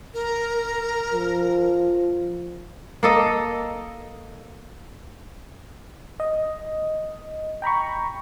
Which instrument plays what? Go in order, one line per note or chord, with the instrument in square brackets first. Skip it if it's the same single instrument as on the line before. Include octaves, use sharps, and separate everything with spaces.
[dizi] A#4
[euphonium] F3
[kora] A#3 A4 D#5
[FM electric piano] D#5
G5 A#5 B5 C#6